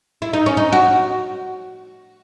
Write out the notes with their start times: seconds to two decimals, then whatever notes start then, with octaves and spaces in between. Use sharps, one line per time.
0.22 E4
0.33 D#4
0.46 C#4
0.57 D#4
0.72 F#4